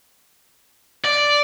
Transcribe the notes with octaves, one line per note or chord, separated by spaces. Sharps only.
D5